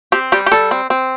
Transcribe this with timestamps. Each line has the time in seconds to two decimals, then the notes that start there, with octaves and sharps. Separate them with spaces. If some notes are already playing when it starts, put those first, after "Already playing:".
0.12 C4 G4
0.32 G3 G4
0.46 G4
0.52 G3 A4
0.71 C4
0.90 C4